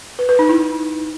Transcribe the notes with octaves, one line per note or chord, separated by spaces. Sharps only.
B4
B4
D#4
E4